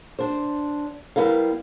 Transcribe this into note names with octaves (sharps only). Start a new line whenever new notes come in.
D4 C5
G3 B3 E4 A#4 F5